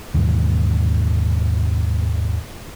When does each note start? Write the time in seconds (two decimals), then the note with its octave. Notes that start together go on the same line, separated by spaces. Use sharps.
0.14 D#2 G#2 B2 E3